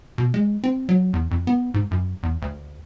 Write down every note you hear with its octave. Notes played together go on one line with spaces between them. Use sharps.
B2
G#3
C4
F#3
E2
F2
B3
G#2
F#2
E2
D2